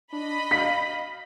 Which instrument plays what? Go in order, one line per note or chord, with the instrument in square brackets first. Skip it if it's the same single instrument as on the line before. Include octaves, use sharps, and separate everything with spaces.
[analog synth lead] D4 [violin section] D#5 B5
[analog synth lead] F5 [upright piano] B6